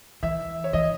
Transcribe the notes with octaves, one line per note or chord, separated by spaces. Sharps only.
E3 E5
C#5
E3 D#5